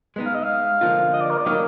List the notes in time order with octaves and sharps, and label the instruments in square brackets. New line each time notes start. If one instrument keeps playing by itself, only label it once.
[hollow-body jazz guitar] G#3 B3 D#4
[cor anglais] F5
D#5
F5
[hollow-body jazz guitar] D3 F3 A#3 F4
[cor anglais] D#5
D5
A#4
D5
[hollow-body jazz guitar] D#3 F#3 A#3 D#4 [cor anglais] D#5